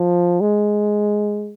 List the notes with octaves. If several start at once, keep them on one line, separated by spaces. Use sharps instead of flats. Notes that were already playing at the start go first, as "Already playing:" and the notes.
Already playing: F3
G#3